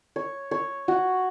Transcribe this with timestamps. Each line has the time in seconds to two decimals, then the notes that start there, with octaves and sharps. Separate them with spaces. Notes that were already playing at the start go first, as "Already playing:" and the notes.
0.16 C#5
0.51 C#5
0.88 F#4